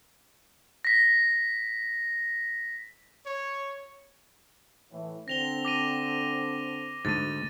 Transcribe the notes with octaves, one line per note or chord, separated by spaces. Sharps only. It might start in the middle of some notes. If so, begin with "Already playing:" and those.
A#6 B6
C#5
A2 E3
D3 C4 A#6 F7 G7
D6 A#6 D#7
D2 G#2 A6 D#7